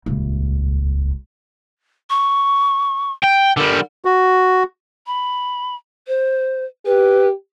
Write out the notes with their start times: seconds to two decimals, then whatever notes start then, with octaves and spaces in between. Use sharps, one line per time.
0.06 D#1 C#2
2.10 C#6
3.24 G5
3.57 D3 G3 A#4
4.05 F#4
5.07 B5
6.07 C5
6.86 G4 B4